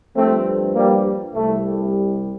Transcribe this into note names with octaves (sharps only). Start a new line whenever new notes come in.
G2 F3 A3 C4
G3 A#3
C2 C3 G3 A3